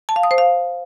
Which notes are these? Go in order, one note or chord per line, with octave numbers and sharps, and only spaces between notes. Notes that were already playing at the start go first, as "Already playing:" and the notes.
A5
F5
D#6
C5
F5